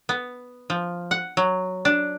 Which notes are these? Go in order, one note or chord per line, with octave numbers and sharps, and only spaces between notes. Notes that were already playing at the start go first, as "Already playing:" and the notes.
B3
F3
F#5
F#3
D4